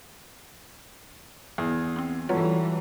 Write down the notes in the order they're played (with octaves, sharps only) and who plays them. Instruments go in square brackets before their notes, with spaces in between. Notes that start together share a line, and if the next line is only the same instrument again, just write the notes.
[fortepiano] E2 [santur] G#4
[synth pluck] B3 C4
[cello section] E3 G3 [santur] F#3 A4 [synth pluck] F4 B4 C#5